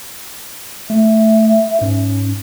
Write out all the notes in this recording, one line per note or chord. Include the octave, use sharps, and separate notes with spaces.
A3 E5
G#2 C#4